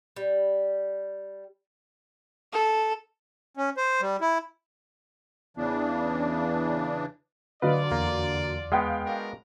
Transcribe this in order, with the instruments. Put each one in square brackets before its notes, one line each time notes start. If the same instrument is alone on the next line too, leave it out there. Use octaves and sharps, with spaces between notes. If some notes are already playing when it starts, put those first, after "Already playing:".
[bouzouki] G3
[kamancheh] A4
[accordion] C#4
C5
G3
E4
[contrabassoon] E2 [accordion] C#3 E3 D4
[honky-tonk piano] D3 F#3 [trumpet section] F4 D5 [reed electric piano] B4 D#5 F5
[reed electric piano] E2 [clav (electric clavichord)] A#3
[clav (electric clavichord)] G#3 B3 [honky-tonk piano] F5 G5
[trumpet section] D4 F#4 A#4